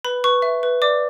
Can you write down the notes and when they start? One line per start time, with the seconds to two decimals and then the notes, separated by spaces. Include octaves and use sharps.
0.05 B4 B5
0.24 B4 C#6
0.42 E5
0.63 B4
0.82 D5 D6